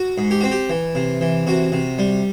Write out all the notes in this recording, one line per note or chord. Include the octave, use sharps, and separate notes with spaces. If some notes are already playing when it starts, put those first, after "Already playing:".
Already playing: F#4
G#2
G4
C4 F#4
G4
E3
C3
E3
C3 F#4
C3
G3